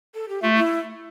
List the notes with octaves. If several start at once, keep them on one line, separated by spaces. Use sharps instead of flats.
A4
G4
A3 F4
E4